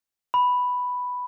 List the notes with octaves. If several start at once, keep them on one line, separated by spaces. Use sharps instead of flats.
B5